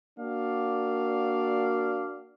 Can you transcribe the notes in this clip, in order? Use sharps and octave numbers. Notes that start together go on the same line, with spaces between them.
A#3 D4 F#4 D5 F5